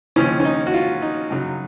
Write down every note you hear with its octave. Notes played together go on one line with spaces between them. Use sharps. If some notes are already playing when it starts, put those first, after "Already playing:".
D#2 C#3 F3 C#4
C#4
D#4
F#4
F4
D#4
F#2 C#3 F#3